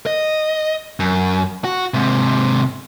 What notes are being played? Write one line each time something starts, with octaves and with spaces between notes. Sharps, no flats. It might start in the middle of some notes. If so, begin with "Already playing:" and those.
D#5
F#2
F#4
G#2 C3